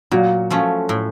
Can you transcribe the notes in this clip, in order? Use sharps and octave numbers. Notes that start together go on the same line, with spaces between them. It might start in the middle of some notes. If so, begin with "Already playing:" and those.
A#2 F#3 F#4
F3 A3 C#4
A2